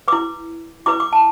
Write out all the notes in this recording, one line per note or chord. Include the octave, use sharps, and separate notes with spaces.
E4 B4 D6
E4 B4 D6
D6
A5